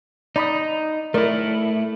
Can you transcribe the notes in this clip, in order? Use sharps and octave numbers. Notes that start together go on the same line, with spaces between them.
D#4 D5 B5 D#6
A3 E4 A#4 D5